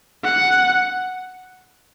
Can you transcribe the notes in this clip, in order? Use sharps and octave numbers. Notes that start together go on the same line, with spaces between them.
F#5